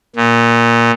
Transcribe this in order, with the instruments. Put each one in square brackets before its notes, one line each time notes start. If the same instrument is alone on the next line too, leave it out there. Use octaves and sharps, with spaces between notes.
[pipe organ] A#2